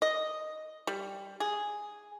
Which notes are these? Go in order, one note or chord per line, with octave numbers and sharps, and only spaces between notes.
D#5
G3
G#4